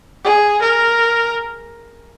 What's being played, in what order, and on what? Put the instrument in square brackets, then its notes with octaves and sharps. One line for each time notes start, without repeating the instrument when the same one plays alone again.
[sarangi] G#4
A#4